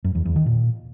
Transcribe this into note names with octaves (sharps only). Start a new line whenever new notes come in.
F#2
E2
E2
D#3
A#2